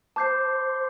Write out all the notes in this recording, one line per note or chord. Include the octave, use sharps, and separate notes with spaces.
C5 A5 D6 G6 C7